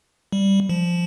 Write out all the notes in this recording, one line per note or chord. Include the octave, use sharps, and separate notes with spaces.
G3
F3